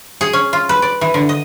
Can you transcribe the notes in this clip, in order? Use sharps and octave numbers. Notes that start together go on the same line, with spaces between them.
G#4
C#4
F4
B4
D5
E3
D3
D#5